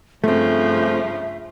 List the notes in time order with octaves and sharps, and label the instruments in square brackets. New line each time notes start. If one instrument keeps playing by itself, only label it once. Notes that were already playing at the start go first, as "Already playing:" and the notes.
[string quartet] G2 C#3 F3 [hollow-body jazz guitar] A3 C4 [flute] E5